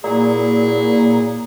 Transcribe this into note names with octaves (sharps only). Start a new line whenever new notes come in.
A#2 F#3 E4 G#4